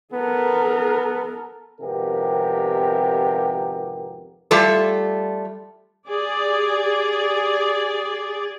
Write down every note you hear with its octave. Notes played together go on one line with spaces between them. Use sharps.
B3 A4 A#4
G#1 F2 C3 B3 G4 A#4
G3 A3 F4 A4
G4 G#4 D5